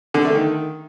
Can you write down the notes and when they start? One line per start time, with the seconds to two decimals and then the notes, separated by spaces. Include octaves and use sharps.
0.14 D3
0.25 A3
0.35 D#3